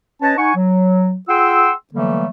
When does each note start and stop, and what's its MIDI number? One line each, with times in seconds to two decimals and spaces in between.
0.22 0.35 61
0.22 0.35 71
0.22 0.35 73
0.22 0.35 75
0.22 0.35 81
0.37 0.51 63
0.37 0.51 78
0.37 0.51 80
0.37 0.51 85
0.55 1.16 54
1.28 1.71 65
1.28 1.71 68
1.28 1.71 78
1.28 1.71 79
1.28 1.71 84
1.28 1.71 88
1.94 2.26 50
1.94 2.26 52
1.94 2.26 54
1.94 2.26 55
1.94 2.26 57
1.94 2.26 58